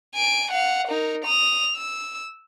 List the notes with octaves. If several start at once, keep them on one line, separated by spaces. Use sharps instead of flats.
G#5 D7
F5 F#5
D#4 A#4
D#6 F7
E6